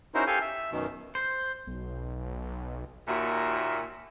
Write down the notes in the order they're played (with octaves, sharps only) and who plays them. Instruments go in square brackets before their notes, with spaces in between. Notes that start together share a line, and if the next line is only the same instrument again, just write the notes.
[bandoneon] C#4 D#4 E4 F#4 A#4 C5
G4 A4 F5 G5 G#5
E5
F#2 B2 D#3
[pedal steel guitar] C5
[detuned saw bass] B1
[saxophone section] D#2 A#2 F#4 E5